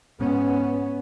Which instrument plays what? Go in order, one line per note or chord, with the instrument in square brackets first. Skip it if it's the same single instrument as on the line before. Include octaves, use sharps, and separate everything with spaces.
[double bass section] G#2 B3 C#4